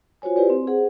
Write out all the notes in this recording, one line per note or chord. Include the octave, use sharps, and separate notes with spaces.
F4 F#4 C5 C#5 G#5
E4 G4 B4 C5 D5
C4
G#4 C5 F#5